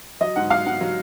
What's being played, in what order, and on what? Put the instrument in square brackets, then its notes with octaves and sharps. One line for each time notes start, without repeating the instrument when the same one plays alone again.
[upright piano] F#3 D#5
G#2 F#5
F#3 F5
G#2 F#5
F#3